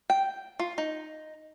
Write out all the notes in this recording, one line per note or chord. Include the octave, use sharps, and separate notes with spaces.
G5
F4
D#4